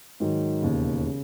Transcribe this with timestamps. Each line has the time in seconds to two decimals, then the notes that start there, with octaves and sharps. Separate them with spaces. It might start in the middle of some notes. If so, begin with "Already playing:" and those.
0.20 G#2 D#3 F#3
0.62 E1 D#2 C#3
1.04 C#3